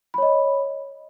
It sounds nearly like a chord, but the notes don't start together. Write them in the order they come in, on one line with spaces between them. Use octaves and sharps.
B5 C#5 D#5